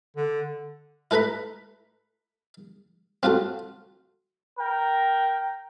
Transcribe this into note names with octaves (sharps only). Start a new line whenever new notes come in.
D3
E4 A4 B4 A#5 B5
C4 F4 F#4 A4
A#4 G5